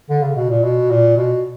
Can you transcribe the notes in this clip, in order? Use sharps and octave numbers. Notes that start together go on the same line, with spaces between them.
D3
C#3
B2
A#2
B2
A#2
B2